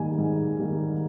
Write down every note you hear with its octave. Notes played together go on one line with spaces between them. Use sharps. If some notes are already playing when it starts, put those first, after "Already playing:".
Already playing: G#2 D#3 G3 A#3 G#5
G#2
D#3 G3 A#3